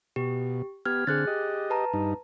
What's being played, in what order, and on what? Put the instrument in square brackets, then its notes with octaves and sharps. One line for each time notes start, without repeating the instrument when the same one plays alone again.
[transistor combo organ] B2 [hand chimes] G4
[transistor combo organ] B3 G4 [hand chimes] F6 G#6
[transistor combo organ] D3 C4 [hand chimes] G#4 F#6 A6
[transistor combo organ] G4 D#5
[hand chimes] B4 A5 A#5
[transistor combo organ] G2 D#4